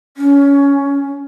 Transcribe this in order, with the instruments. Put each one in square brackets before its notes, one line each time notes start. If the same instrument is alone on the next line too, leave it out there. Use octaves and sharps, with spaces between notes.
[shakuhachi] C#4